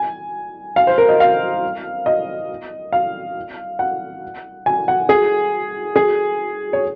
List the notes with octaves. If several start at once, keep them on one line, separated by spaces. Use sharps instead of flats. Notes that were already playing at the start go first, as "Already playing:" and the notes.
Already playing: G#5
F5
C5
A#4
D#5
F5
D#5
F5
F#5
G#5
F#5
G#4
G#4
C#5